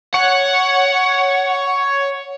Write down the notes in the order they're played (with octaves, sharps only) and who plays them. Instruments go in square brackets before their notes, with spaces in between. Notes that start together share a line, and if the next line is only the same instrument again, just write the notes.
[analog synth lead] C#5 [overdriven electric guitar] F#5